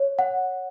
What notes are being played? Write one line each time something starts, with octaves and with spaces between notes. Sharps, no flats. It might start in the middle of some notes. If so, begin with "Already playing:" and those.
Already playing: C#5
F#5